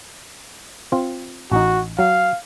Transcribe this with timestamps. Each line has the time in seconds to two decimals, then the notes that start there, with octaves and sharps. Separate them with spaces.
0.92 C4 F4
1.52 A1 D#4 F#4
1.99 F#3 F5